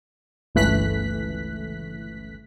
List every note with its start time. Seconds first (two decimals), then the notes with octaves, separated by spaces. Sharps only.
0.55 G1 C#2 E3 A3 F#6 B6